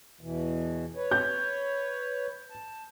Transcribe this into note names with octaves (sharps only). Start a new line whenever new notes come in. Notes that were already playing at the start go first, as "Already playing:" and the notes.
E2 B2 E3
B4 C#5
G6
A5